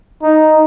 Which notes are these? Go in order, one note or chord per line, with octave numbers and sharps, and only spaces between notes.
D#4